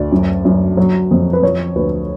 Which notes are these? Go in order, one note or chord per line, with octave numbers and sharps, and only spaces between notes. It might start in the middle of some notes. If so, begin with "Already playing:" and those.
Already playing: D2 D5
F#2
F#2
F#3
F2
B4
F3 C#5
D2 B4